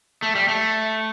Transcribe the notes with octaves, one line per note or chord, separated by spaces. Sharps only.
A3
G3
A3